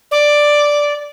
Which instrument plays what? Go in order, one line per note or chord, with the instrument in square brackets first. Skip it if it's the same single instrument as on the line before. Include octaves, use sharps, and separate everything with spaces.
[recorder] D5